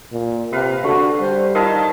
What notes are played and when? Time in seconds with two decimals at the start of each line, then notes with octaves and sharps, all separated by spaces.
0.12 A#2
0.52 C3 A#4 B4 F5
0.84 D3 A3 F#4
1.20 G3 C5
1.55 D#3 E4 D#5 F5 A5